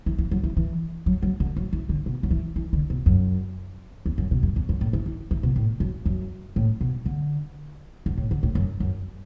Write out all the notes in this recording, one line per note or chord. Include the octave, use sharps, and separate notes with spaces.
E3
E3
F#3
E3
E3
F#3
F#3
D3
F#3
E3
D3
B2
F#3
E3
E3
D3
B2
F#2
E2
F#2
B2
F#2
E2
F#2
A2
E3
E3
E3
B2
A2
F#2
F#2
A2
B2
D3
F#2
A2
D3
A2
F#2
F#2